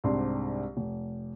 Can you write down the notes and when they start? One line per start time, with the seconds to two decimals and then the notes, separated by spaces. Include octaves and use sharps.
0.04 C2 G#2 C4 D4 G4 C6
0.77 F1